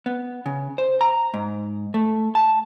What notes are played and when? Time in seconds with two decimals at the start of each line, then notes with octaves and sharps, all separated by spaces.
0.06 B3
0.46 C#3
0.78 C5
1.01 A#5
1.34 G#2
1.94 A3
2.35 A5